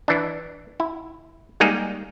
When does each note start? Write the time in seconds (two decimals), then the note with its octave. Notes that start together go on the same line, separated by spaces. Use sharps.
0.08 E3 D4
0.80 E4
1.60 G3 G#3 A#3 D#4 G#4